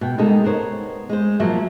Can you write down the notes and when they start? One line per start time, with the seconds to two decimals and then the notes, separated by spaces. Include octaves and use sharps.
0.01 B2 G5
0.18 C3 G3 G#3 A#3 D#4 A4
0.44 B3 A#4 C5 C#5
1.09 G#3 C5
1.40 A#2 F3 F#3 A#3 E5